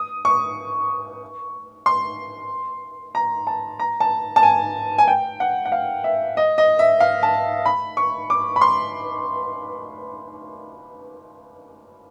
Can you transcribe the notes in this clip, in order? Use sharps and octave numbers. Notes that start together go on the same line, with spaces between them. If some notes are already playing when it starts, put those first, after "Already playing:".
Already playing: D#6
C#6
C6
A#5
A5
A#5
A5
A5
G#5
G#5
G5
F#5
F#5
F5
E5
D#5
D#5
E5
F5
A5
B5
C#6
D6
B5
C6